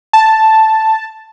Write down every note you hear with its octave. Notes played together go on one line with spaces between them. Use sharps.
A5